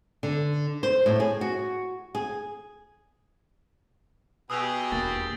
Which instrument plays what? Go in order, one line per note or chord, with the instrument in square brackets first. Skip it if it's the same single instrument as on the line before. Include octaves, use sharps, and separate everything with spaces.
[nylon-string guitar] D3
C5
A2
G#4
F#4
G#4
[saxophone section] B2 [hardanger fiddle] G4 G#4 [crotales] D#6 E6 F7
[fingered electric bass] E1 D#2 A#3 [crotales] A6